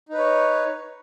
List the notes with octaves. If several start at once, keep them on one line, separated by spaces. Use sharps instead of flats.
D#4 B4 C#5